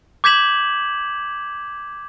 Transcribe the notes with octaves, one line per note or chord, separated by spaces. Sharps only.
D6 G6 G#6 B6 E7 F#7